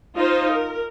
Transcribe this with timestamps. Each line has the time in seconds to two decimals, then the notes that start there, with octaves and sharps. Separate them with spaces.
0.18 D#4 F4 C5 D#5
0.51 A#4